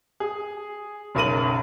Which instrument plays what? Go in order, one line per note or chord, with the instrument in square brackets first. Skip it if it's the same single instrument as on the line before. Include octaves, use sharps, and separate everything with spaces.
[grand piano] G#4
F#1 B1 A#4 D#7 F#7